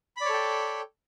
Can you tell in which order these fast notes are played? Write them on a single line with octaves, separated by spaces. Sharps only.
B5 D5 C#5 A4 G5